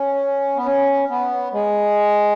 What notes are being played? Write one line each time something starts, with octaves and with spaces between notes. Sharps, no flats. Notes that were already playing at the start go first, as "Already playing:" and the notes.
Already playing: C#4
B3
C#4
B3
G#3